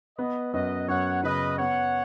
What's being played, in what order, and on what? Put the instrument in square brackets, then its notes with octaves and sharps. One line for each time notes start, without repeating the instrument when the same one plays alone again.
[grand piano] B3 [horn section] B4 D#5
[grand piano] F#2 [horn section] B4 D#5
[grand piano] F#2 [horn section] C#5 F#5
[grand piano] C#3 [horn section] B4 D#5
[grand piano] B3 [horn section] C#5 F#5